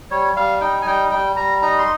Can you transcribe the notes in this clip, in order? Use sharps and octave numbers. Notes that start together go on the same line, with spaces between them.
G3 C#5
G3 F5
D#4 G5
G#5
G3 G5
G3 G5
G3 A#5
D#4 A#5
C6